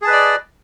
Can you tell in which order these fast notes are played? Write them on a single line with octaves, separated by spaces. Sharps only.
G#4 A5 B4 D#5 D5